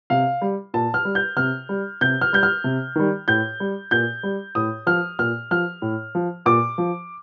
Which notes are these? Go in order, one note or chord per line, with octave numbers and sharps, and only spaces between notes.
C3 F5
G3
A#2 A5
F6
G3
G6
C3 F6
G3
C3 G6
F6
G3 G6
F6
C3
D#3 G3
A2 G6
G3
A#2 G6
G3
A2 D#6
F3 F6
A#2 F6
F3 F6
A2
F3
A#2 D6
F3